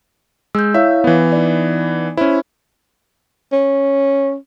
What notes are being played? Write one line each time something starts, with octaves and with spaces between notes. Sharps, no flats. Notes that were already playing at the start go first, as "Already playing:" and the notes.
G#3 E6 G6
E4 C#5 E5 F5
E3 B3
D#4 D5
C#4 E4 C5
C#4